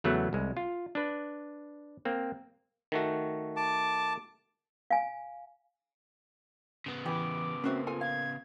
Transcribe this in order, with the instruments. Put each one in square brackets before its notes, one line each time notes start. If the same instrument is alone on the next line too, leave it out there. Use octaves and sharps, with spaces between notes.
[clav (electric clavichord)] E2 C#3 F#3 A3 B3 F#5
C2 G#3
F4
D4 B4
A#3 C4
D#3 A3 F#4
[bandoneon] A5 D6
[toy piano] F5 G#5
[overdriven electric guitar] C#3 B3
[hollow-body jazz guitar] E3 B4 [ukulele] G4 [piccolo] D6
[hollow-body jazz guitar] A#3 C4 [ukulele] C#4 F#4 E5
[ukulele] F4 A4 G#5
[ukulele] F5 [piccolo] G#6